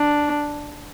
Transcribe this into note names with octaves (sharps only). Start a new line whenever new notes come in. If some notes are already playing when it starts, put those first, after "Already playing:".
Already playing: D4